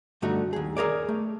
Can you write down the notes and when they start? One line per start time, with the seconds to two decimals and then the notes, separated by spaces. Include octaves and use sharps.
0.22 G2 D3 A3 D#4 F#4
0.53 D#2 G#4
0.77 G#4 A#4 C#5 D5
1.09 A3